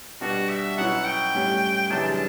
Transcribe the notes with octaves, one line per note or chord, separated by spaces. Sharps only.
B2 G3 D4 F#4
E5
B2 F#3 C#4 E4 F#5
G5
A2 G3 C#4
F#2 C#3 E3 G3 D4 A5
A5